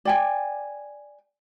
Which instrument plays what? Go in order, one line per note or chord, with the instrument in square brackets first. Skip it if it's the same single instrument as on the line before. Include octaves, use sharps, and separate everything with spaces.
[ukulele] D5 G5 G#5